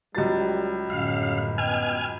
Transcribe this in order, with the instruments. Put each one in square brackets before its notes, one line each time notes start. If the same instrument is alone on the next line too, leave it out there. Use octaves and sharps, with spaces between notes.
[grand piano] C#2 F#3 A6 [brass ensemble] G3
[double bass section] G1 F#2 A2 [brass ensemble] C#3 [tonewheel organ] F5
[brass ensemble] B3 D#5 G5 [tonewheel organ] G#5 F6